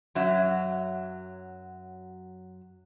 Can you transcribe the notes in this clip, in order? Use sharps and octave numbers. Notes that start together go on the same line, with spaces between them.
F#2 F#3 E5